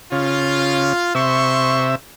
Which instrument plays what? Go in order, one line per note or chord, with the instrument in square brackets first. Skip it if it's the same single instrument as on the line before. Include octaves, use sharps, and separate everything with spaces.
[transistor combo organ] C#3 [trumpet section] F4
[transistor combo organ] C3 E5 [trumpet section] C6 C#6